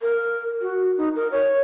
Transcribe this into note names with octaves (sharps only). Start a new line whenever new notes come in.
A#4
F#4
D#4
A#4
C#5